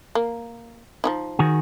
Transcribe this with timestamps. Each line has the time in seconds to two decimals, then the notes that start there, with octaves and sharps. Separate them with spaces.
0.15 A#3
1.04 F3 D#4 E4
1.39 D#3 F#4 G#4